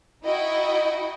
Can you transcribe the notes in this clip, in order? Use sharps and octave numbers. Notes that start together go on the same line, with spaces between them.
D#4 E4 F#4 D#5 G5